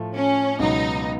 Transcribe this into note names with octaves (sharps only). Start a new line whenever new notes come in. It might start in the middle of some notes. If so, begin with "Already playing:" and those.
Already playing: A2 F3 A3
C#4
C#2 B2 F#3 B3 D#4